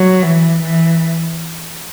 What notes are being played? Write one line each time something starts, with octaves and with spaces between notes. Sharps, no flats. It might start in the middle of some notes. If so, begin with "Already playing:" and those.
Already playing: F#3
E3
E3